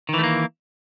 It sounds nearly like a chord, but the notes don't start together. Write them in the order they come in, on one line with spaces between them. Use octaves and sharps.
D#3 E3 A3 A#3